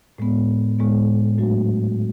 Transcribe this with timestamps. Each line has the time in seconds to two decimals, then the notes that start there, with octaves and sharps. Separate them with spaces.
0.18 A2 G#3 B3
0.79 A2 G#3 B3
1.38 G#2 F#3 A3 D4 F#4